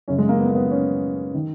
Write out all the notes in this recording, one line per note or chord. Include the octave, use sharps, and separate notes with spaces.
F#2 C#3 C#4
G#3
A#3
B3
A#3
B3
C#4
D#3